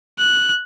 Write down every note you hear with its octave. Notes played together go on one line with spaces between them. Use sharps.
F#6